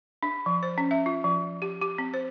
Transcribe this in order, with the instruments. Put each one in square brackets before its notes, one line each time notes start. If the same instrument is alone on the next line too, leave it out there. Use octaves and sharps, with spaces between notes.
[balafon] D4
F3
C5
C#4
E5
F4
F3
G4
G4
C4
C5